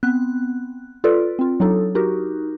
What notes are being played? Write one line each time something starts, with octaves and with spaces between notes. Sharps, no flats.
B3 C4 F#6
F4 A4 B4 D5
C4 F4
F#3 D4 D#4 A4
D#4 F#4 G4 A#4